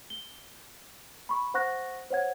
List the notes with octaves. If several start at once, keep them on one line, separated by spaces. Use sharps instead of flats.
G7
B5 C#6
C5 F#5 C#6 F#6 A#6
C5 C#5 F#5 G#6